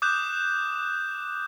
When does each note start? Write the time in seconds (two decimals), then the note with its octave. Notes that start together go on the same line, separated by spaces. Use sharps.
0.02 D6 D#6 F#6 G6 E7